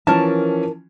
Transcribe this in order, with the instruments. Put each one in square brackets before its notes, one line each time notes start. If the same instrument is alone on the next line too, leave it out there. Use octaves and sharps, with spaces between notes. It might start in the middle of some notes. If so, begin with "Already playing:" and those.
[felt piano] E3 F3 C#4 [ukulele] A#4 A5